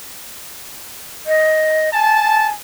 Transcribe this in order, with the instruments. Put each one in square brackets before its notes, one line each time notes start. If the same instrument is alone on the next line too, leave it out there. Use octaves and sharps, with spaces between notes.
[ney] D#5
[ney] G#5 [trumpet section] A5